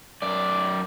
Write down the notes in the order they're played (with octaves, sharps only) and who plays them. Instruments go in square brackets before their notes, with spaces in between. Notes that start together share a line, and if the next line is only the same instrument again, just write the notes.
[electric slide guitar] F#2 D5